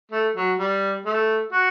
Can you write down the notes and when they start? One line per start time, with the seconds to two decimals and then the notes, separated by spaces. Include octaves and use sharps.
0.11 A3
0.36 F#3
0.59 G3
1.06 A3
1.53 F#4